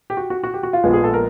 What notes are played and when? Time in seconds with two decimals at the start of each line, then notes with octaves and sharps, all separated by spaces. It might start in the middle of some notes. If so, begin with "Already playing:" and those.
0.10 G4
0.17 F#4
0.30 F#4
0.44 F#4
0.54 G4
0.63 F#4
0.73 F4
0.84 A#1 A#2 F3 G#3 B3
0.93 G#4
1.04 A4
1.14 A#4